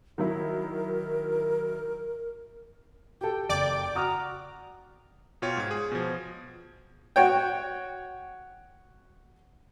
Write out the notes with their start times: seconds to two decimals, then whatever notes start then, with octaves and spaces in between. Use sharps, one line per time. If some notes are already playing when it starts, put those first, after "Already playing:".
0.18 D#3 F#3 E4 A#4
3.21 G4 A4 G5
3.49 F#1 D5 G5 D6
3.95 F#4 A#5 D#6 F6
5.42 B2 F4 C#5 G5
5.57 G#2 G#6
5.71 G#4
5.92 B2 F3
7.16 F#4 C#5 G5